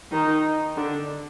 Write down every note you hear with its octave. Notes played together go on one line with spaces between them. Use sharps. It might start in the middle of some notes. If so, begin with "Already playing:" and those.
D#3 D#4
D3 D4